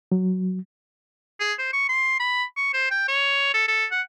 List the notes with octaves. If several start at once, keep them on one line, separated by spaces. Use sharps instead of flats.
F#3
G#4
C5
C#6
C6
B5
C#6
C5
G5
C#5
A4
A4
F#5